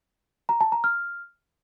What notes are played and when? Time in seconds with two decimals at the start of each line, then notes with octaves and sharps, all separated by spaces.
0.49 A#5
0.61 A5
0.72 A#5
0.84 F6